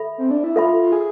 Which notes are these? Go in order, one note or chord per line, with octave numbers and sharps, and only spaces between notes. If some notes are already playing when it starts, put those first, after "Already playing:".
Already playing: A4 E5 B5
C4
D4
E4
F4 A4 E5 B5
F4
G#4